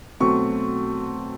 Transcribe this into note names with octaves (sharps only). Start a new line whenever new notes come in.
B2 F#3 A3 C4 C#6